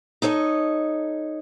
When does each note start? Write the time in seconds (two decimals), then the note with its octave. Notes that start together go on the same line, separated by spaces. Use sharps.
0.22 D#4 A4 C#5 D#5